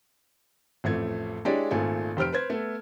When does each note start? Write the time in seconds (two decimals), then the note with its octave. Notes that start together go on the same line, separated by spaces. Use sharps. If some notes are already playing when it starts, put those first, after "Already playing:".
0.84 A1 F2 A3 G#6
1.45 G#3 D4 E4 G4 C#5 D5
1.71 G#1 A#2 A3 G#5
2.17 F1 G4 C5 F6 D7
2.32 B4 C5 G#6
2.50 A3 B3 A4